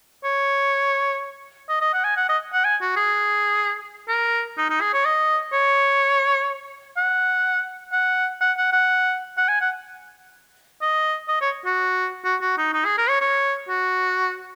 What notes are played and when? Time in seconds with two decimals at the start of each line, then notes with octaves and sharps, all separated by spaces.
0.24 C#5
1.69 D#5
1.81 D#5
1.93 F#5
2.04 G#5
2.17 F#5
2.29 D#5
2.53 F#5
2.65 G#5
2.82 F#4
2.96 G#4
4.08 A#4
4.58 D#4
4.70 D#4
4.81 G#4
4.94 C#5
5.05 D#5
5.53 C#5
6.97 F#5
7.93 F#5
8.41 F#5
8.58 F#5
8.73 F#5
9.38 F#5
9.49 G#5
9.61 F#5
10.82 D#5
11.28 D#5
11.41 C#5
11.65 F#4
12.25 F#4
12.42 F#4
12.58 D#4
12.74 D#4
12.85 G#4
12.98 A#4
13.09 C#5
13.21 C#5
13.69 F#4